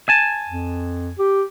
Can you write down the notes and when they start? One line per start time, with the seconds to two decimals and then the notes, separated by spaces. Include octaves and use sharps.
0.09 G#5 A5
0.48 F2
1.19 G4